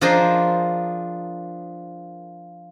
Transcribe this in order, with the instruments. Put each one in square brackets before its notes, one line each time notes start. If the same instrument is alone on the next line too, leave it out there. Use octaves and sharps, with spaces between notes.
[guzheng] F3 D4 G#4 A#4 C5 D#5